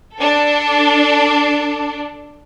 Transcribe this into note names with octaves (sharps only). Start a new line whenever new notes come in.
D4 A4